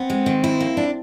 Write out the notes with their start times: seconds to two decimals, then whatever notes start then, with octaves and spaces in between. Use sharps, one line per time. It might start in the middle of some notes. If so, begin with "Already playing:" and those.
Already playing: B3 C4
0.10 G#3
0.26 D#3
0.44 E4
0.60 A#3
0.77 D4